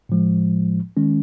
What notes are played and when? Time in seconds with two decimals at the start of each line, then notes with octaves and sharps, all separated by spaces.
0.09 A2 F3 G#3
0.97 D#3 G#3 C#4